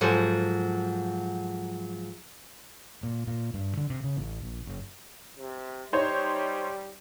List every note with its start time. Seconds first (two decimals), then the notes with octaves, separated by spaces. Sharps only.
0.01 G#2 F3 F#3 A4 G#5
3.03 A#2
3.27 A#2
3.54 G2
3.77 D3
3.90 C3
4.04 C#3
4.17 A1
4.42 A#1
4.67 F#1
5.39 C3
5.93 G3 D#4 C5 C#5